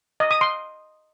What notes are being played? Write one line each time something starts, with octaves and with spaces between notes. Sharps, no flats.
D#5
D#6
C6